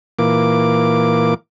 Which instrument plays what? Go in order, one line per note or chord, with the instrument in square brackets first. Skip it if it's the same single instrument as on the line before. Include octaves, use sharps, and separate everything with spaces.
[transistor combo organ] A#2 E3 A#3 D6